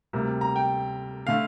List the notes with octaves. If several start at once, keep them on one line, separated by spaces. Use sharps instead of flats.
D2 C3 G3 A#3
A#5
G5
D3 A3 F5